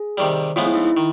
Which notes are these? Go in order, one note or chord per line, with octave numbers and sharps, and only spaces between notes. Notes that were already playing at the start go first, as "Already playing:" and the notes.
Already playing: G#4
C3 D#3 G3
A2 F3 G#3 B3 F4
E4
D#4
E4
D#3